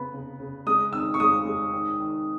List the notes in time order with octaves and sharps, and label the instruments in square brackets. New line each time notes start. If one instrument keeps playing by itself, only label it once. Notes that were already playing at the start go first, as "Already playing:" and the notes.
Already playing: [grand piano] C#3 B3 B5
C#3
C#3
G#3 D#6
D#3 E6
C#6
G#3 D#6
G#3
D#3
D#3